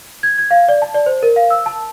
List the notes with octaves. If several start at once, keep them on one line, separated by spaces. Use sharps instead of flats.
G#6
G#6
F5
D5
A5
D5
C5
A#4
F5
E6
A5